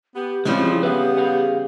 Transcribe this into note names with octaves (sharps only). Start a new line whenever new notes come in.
B3 G4
C#3 E3 F3 G3 G#3 C4 E4
B3 G4 B4 E5 F5
G#4 F5 F#5